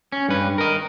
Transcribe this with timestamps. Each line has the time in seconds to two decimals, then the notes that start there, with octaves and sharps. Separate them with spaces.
0.12 C#4
0.29 G2 B4
0.58 A#4 D#5